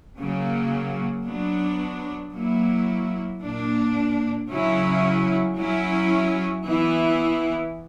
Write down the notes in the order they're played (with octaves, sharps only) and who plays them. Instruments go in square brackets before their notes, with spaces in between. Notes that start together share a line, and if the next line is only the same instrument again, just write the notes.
[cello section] C#3 F#3 A#3
F#3 B3 D4
F#3 A#3 E4
A#2 A#3 D4
C#3 F#3 C#4 E4
F#3 C#4 E4
E3 B3 E4